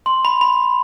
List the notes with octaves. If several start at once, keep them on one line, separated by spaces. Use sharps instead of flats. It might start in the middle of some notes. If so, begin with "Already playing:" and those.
C6
B5
B5